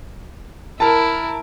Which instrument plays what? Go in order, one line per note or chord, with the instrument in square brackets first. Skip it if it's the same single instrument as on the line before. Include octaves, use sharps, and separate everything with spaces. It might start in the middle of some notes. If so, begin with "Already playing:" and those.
[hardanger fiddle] E4 [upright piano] A#4 A5